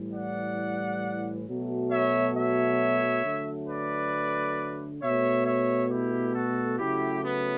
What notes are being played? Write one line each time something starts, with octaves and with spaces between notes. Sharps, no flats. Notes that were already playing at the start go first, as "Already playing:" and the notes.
Already playing: A2 E3 G3
D5 F#5
B2 F#3 A3
C#5 E5
C#5 E5
D3 F#3 A3
B4 D5
B2 A3 C#5 E5
C#5 E5
E4 G4
F#4 A4
C#3 F#3 A3 E4 G4
B3